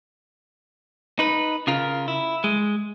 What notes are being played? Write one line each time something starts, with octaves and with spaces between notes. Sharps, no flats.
D#4 B4
C#3 F4 A#4
E4
G#3